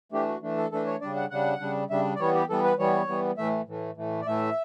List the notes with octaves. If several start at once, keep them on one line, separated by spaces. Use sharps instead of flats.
E3 A3 D4 G4
F#4
E3 A3 D4
A4
E3 A3 D4 A4
C#5
C#3 G3 D4 D5
F#5
C#3 G3 D4 F#5
C#3 G3 D4
C#3 G3 D4 E5
D5
E3 G3 B3 C#5
G4
E3 G3 B3 A4
B4
E3 G3 B3 C#5
E3 G3 B3
A2 E3 A3 E5
A2 E3 A3
A2 E3 A3
D5
A2 E3 A3 E5